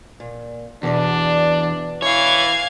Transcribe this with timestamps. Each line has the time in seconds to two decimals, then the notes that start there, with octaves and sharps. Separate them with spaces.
0.20 A#2
0.83 E2 B2 D4 B4 D5
2.02 E3 C#5 F5 G#6